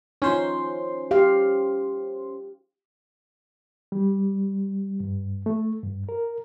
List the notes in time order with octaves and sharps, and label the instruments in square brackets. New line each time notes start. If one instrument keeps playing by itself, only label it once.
[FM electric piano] C#4 C5 C6 [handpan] D#4 F4
[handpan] G4 F5
[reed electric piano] G3
G2
A3
G2
A#4